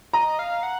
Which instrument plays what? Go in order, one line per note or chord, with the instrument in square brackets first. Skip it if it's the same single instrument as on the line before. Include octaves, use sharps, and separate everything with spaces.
[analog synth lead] D#5 [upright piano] A#5
[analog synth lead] F5
F#5